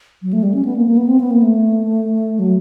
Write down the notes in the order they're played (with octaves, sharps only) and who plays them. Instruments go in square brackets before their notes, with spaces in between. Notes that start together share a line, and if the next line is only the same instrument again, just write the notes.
[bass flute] F#3
A3
G3
C#4
B3
A#3
A#3
B3
C4
B3
A#3
A3
F#3